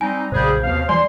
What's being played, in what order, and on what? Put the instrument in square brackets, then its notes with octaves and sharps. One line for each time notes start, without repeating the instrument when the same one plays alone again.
[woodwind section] G3 C4 D#4 [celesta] G#5
[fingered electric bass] B1 F#2 A#2 [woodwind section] C#3 G3 G#4 [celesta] C5 G6
[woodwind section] D#2 F5 [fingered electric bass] C3 A#3 B3
[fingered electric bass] E3 G3 [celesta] D5 G#5 [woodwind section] C6